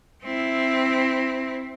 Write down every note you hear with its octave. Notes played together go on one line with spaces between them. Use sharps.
C4 E4